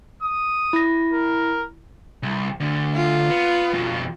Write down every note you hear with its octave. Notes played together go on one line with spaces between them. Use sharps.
D#6
E4 A#6
A#4
C2
D2 D3
F4
B3
F2 B2